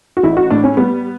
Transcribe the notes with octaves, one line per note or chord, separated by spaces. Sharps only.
F#4
A1 E4
F#4
A2 D4
C#4
G3 B3